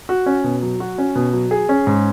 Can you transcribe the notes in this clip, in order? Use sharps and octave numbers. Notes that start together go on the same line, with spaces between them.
F#4
C#4
B2
F#3
F#4
C#4
B2
F#3
G#4
C#4
G#2